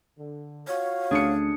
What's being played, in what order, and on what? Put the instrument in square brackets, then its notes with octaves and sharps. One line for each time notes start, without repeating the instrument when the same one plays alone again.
[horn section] D3
[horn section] F4 F#4 F5 [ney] C#5
[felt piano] D2 C#7 [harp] C#4 D4 G#4